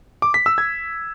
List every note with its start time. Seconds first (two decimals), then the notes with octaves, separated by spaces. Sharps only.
0.22 D6
0.34 B6
0.46 E6
0.58 G#6